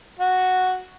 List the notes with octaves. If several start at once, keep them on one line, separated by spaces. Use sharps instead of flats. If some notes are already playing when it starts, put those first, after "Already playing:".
F#4